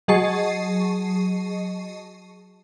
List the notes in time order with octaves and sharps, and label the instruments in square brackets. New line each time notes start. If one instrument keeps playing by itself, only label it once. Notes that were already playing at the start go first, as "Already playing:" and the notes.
[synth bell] F#3 G#4 D#5 A5 C#6 C7